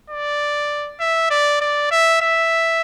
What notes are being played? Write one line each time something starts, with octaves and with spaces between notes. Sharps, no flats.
D5
E5
D5
D5
E5
E5